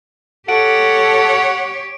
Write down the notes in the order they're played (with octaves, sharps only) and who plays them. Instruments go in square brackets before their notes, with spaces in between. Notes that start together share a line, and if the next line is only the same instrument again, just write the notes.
[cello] G4 C#5 [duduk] A4 [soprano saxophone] F#5 [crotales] D7